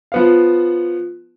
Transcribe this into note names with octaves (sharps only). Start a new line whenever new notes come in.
F3 B3 F5